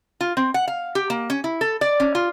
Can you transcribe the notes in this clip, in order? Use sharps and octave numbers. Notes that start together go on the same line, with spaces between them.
F4
C4
F#5
F5
G4
A#3
C#4
E4
A4
D5
C#4
F4